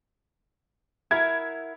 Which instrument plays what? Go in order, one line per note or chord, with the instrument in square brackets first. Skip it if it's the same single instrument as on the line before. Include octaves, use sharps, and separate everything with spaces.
[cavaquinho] E4 A#4 F#5 [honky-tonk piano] G#6